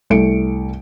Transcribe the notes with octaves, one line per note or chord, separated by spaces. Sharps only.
C2 A3 C#7 D7